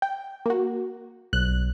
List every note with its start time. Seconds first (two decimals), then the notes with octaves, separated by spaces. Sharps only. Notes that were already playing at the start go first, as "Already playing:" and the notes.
0.02 G5
0.46 A#3 F#4
1.33 B1 F#6